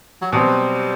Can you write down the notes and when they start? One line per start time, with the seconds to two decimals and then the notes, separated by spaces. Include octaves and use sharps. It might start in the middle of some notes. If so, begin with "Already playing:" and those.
0.22 F#3
0.32 B2 F#3 G3 C4